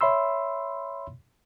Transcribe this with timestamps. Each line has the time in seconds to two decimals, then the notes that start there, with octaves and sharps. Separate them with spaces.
0.01 C#5 E5 B5 C6 E6